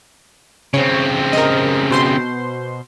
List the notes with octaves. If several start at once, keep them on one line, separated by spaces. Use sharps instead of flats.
C#3 C4 C#5
A#4 D#5
B2 C5 C6